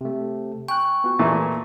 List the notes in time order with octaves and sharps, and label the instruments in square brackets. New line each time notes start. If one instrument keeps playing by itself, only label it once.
[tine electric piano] C3 A3
[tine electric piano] G5 G#5 F#6 [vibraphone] C#6
[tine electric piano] B3 F4 F#4
[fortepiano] A#2 E3 A3 [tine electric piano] A6